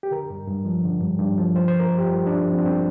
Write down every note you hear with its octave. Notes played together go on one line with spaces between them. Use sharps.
G4
D3 A#4
G2
G2
F3
D3
G2
G2
F3
F3 C5
C5
F3
A#4
G2
G4
F4
G2
F3 D4
F3
C4
D4
G2 C4